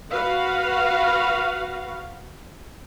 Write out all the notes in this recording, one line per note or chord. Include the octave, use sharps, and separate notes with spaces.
F#4 B4 F5